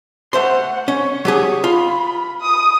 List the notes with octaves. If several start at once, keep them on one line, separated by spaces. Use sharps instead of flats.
A3 C5 F#5 C6
C#4 C#6
F#3 G4 G#4
F4 B5
D#6